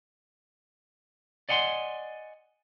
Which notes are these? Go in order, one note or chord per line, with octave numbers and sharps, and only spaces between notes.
D5 D#5 F#5 G#5 C6